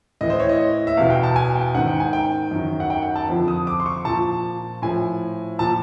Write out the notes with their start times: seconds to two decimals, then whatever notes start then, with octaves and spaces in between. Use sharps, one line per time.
0.21 A2 E3 D#5
0.30 C5
0.40 C#5
0.49 D#5
0.87 E5
0.97 E2 B2 F5
1.10 G5
1.23 A5
1.36 G#5
1.55 G5
1.75 G#2 D#3 F#5
1.87 G5
2.00 G#5
2.13 G5
2.51 F#2 D#3
2.80 F#5
2.90 G5
3.03 F#5
3.16 A5
3.28 F2 D3 F3
3.48 D#6
3.67 D6
3.80 C6
3.86 C#6
4.05 A#2 F3 A5
4.82 A2 F3 G#5
5.59 A#2 F3 A5